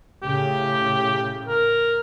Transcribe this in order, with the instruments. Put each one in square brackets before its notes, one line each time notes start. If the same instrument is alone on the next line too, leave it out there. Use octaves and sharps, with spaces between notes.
[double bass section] A2 C#3 [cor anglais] G4
[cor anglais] A#4